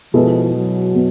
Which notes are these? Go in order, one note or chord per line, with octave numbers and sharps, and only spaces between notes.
B2 F3 G#3 B3 E4 A4
F#3
B2